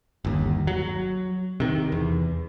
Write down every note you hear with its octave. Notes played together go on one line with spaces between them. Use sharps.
G1 D#2
F#3
C3 D#3
E2